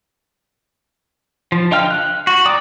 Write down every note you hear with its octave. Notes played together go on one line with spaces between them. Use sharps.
F3
D3 D#5 F5 G5 F6
F#6
F#4
D5 G5 A#5 D6 D#6